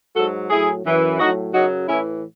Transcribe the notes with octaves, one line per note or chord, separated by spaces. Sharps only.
G#2 F#3 F#4 A4
A2 F#3 E4 G#4
F#2 E3
A2 F#3 D#4 F#4
F#2 C#3 F#3 D#4 F#4
A2 E3 C#4 E4